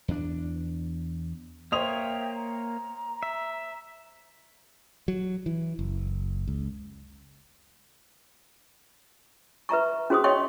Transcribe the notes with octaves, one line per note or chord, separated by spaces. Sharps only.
E2 D4
A#3 C5 C#5 E5 G5 D#6 F7
A#5
E5
F#3
E3
F#1
C#2
B4 E5 A#5 C#6
C#4 F#4 G#4 C5 C6 D#6
C#5 D#5 F5 G5 C6 C#6